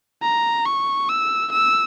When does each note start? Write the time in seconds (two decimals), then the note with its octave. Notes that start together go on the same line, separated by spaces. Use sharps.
0.22 A#5
0.66 C#6
1.09 E6
1.52 E6